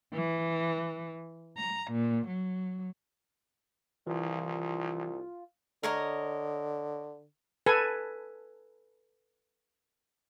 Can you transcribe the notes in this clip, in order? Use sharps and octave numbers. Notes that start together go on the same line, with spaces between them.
E3
A#5
A#2
F#3
C2 E3 F4
D3 A#4 C#5 D#5
A4 B4 G#5